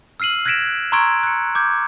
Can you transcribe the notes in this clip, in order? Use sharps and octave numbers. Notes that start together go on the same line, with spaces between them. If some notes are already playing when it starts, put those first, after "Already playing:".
E6 F6 C7 D#7 F#7
F#6 G#6 A#6 B6 D7 E7
A#5 C6 C#6 E6 G#6 D7
F#6 C#7
D6 G6 G#6